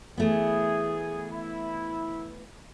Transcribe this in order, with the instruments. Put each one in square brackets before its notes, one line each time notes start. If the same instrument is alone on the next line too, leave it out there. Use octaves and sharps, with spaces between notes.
[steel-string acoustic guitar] E3 A3 B3 [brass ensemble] G#4
[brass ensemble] E4